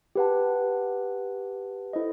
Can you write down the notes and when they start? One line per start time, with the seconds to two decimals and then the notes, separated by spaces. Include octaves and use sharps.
0.15 G4 B4 F#5 A5
1.93 E4 A4 C5 D#5